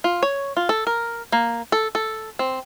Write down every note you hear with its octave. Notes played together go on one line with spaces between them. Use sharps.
F4
C#5
F4
A4
A#4
A#3
A4
A4
C4